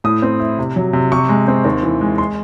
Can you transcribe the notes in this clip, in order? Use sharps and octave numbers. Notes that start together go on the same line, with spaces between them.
A2 D#6
C4
E4
C3
F#3
C3
C3 C#6
G#3
C4
D#2
E3
G#3
C6